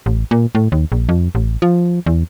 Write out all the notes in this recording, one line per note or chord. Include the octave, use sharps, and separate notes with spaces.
A1
A#2
A2
D#2
A#1
F2
A1
F3
E2